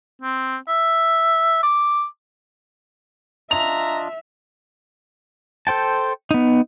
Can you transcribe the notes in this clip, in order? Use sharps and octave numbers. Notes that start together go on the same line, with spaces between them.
C4
E5
D6
D4 F4 D#5 E5 A#5 F7
A4 C5 G5 A5
B3 D#4